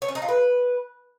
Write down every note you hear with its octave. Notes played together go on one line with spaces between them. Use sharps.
C#5
C#4
D#4
F4
B4